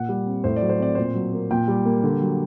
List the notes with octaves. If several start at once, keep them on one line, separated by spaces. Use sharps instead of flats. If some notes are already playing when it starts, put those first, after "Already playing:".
Already playing: A#2 F#5
G3
C4
A2 C5
D5
F#3
C5
C4 D5
A#2 C5
F#3
A#3
A#2 G5
G3
A#3
D3
F#3